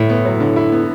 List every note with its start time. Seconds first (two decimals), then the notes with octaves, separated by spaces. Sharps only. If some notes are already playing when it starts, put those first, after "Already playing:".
Already playing: G1 A2 E4
0.09 B3
0.25 F#3
0.40 D3
0.56 E4
0.72 B3